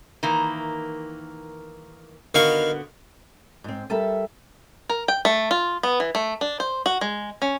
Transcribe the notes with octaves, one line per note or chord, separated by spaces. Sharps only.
D#3 E3 A#3
D3 D#3 B3 F#4 F5 C#6
G#2 C4
G3 A4 A#4 E5
A#4
G5
A3
F4
B3
E3
A3
D4
C5
F#4
G#3
C#4